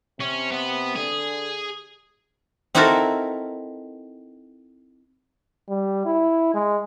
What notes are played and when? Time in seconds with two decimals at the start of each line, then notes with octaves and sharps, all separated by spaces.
0.20 C3 C#4
0.51 B3
0.96 D3 G#4
2.75 C4 D#4 E4 F#4 A4 A#4
5.69 G3
6.05 E4
6.54 G#3